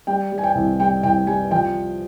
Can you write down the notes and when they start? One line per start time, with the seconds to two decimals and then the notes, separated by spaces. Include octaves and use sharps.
0.07 G3 G5
0.32 G3
0.38 G#5
0.43 G5
0.55 C2
0.79 G3 G5
1.03 C2 G5
1.27 G3 G#5
1.51 F3 G5